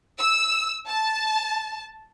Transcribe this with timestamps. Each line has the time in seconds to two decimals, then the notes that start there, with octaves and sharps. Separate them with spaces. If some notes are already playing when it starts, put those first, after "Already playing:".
0.19 E6
0.88 A5